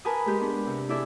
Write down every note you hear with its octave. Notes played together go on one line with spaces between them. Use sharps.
A#4 B4 G#5 A5 D#6
G#3 G4
B3 D4
C3
E4 G#4 A4 D5 E5